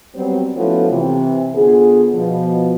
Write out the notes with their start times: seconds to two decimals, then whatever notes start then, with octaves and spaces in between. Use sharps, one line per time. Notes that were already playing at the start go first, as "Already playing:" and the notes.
0.15 F#3 G3 B3 C4
0.56 F3 A3 B3 C#4 E4 F#4
0.90 C3 E3
1.55 D3 B3 F4 G#4
2.15 B2 F3